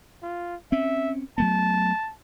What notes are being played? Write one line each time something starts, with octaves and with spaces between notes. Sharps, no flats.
F4
C4 C#4 E5
F#3 A3 B3 A5